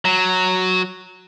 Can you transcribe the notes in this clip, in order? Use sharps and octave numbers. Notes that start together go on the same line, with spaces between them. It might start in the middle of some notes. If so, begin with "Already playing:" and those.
F#3